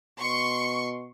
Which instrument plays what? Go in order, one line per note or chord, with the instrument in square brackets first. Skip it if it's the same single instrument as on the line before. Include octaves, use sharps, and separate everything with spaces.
[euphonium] B2 [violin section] C6 C#6